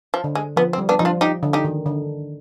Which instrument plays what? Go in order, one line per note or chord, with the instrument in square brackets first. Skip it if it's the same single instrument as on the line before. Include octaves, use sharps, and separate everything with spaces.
[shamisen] F3
[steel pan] D3
[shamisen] G#3
[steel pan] F3 [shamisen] B3
[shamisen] C4
[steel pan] G3
[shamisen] B3 D4
[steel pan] F3 [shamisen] D#4
[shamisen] D4 F4
D#4 G4
[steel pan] D3
[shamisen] D#4 G4
[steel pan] D#3
D3